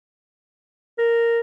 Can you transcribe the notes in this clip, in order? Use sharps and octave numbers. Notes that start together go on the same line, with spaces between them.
A#4